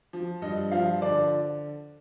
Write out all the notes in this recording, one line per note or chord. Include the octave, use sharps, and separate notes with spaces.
F3
G2 D#5
F3 F5
D3 D5